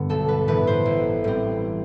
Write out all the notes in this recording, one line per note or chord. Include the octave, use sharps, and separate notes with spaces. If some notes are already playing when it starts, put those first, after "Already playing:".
Already playing: G2 D3 B3
B1 A4
B4
A2 E3 B3 B4
C5
A1
A2 G3 C4